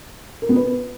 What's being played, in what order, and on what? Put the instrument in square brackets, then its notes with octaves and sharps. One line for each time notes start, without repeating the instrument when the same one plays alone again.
[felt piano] A#4
B3
B4